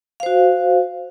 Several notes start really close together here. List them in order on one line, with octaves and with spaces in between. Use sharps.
F5 C5 F#4